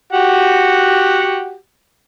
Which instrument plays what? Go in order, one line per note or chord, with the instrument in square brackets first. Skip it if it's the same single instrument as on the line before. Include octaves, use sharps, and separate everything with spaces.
[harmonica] F#4 G4 F#5